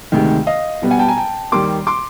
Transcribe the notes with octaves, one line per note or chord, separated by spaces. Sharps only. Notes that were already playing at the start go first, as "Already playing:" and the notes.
D2 C3 D#3 G#3
D#5 F5
B2 G3 B3
F#5 G#5
G5 A5
G#5 A#5
G5 A5
D#2 D#3 G3 A#3 C6 D6
C6 D6